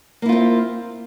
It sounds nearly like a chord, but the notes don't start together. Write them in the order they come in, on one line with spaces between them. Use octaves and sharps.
A#3 E4 F4 C4